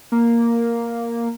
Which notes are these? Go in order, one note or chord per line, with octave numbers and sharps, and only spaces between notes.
A#3